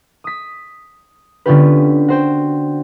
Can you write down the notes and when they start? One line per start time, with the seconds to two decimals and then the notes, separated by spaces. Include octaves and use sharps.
0.24 D#6 B6
1.46 D3 B3 C#4 F4 G4 B4
2.08 F#4 C5 G5